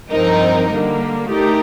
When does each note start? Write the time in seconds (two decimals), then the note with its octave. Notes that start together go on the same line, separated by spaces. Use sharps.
0.10 G2 F3 C4 D#4 A#4
0.70 D3 G3 A#3
1.29 A3 D#4 G4 A#4 D5